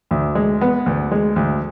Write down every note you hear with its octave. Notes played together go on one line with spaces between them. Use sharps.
D2
G#3
B3
D2
G#3
D2